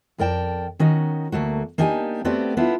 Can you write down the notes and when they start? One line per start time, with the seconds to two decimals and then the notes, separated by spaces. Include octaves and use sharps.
0.18 F2 A#4 D5 G5 A5
0.79 D#3 C#4 D#4 F#4
1.32 D2 A3 A#3 F#4
1.78 A#3 D4 D#4 G4 F5 G#5
2.25 A3 B3 C4 F#4 G4 D5
2.57 B3 D4 E4 F4